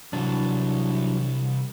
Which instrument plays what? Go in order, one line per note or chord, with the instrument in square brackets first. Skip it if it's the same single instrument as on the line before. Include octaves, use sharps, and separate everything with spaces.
[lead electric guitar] C2 [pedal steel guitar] E3 F#3 D4